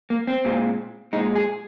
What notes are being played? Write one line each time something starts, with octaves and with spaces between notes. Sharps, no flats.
A#3
C4
A#2 G#3
A#2 G#3 D#4
G#4